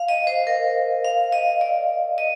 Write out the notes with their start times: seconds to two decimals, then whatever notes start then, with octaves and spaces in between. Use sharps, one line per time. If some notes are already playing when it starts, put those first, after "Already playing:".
Already playing: F5
0.08 D#5
0.27 C5
0.47 A#4
1.04 F5
1.32 D#5
1.61 D5
2.18 D#5